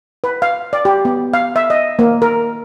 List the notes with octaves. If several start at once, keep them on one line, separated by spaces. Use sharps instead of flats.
B4
F5
D5
G4
B3
F5
E5
D#5
A#3
A#4